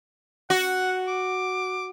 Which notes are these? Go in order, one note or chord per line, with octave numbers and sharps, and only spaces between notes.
F#4 F#5
D6